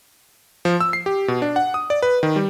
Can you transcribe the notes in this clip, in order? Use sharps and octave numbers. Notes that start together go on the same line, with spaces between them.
F3
E6
C7
G4
B2
D4
F#5
D#6
D5
B4
D#3
G3